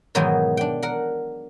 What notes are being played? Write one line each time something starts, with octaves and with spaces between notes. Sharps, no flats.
G#2 B2 D#3 E3 F#3
D4 G5
A#4 F#5